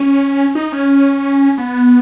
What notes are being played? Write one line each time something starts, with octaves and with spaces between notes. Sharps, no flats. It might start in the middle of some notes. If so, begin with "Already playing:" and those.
Already playing: C#4
D#4
C#4
B3